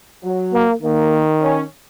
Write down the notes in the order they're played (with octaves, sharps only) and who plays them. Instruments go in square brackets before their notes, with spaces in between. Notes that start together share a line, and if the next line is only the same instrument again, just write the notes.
[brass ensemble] F#3
[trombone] A#3
[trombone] D#3 [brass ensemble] A#3
[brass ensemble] C#4